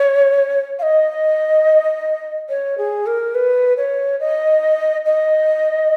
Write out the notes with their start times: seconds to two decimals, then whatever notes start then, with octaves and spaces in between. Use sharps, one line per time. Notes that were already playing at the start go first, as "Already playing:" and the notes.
Already playing: C#5
0.79 F5
0.82 D#5
2.49 C#5
2.78 G#4
3.06 A#4
3.35 B4
3.77 C#5
4.20 D#5
5.06 D#5